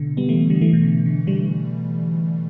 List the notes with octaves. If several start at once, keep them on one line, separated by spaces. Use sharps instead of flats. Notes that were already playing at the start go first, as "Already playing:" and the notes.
Already playing: B2 D3
G3 B3
E3 A3
D3 G3
E3 A3
B2
D3
D3
D3 G3